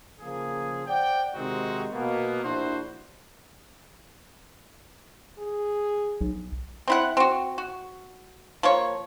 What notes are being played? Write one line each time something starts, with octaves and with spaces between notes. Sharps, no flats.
C#3 F3 A#3 G#4
C5 D5 F#5 G5
C3 D#3 G#3 C4 D#4 F#4
B2 A#3 B3
A#1 D4 E4 F#4 C5
G#4
B1
C4 E4 F#5
C4 F#4
F#4
F3 A#3 C#5